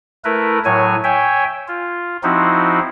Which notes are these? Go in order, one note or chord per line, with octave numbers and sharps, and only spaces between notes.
A3 E4 A#4 B4
A2 F#3 C#5 G#5
C#5 E5 G5 G#5
F4
F3 C4 D#4 E4 F#4